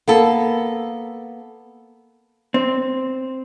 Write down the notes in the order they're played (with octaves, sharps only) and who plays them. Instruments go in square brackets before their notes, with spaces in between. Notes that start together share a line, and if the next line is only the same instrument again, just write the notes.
[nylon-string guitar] A#3 B3 A4
[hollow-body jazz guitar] C4